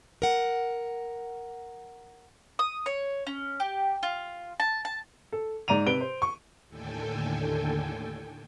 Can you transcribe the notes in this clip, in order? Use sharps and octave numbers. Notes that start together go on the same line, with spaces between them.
A#4 F#5
D#6
C#5
C#4
G4
F4
A5
A5
A4
G#2 D5 A#5 D#7 F7
C3 B4 D7 G7
C5
C#6
D#2 A2 D3 A4 G5 G#5